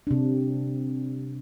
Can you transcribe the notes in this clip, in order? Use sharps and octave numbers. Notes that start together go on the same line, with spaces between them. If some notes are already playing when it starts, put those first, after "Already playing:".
C3 D4